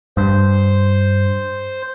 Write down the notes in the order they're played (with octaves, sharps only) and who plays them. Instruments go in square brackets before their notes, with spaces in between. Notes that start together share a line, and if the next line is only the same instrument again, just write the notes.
[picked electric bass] G2 [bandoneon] C5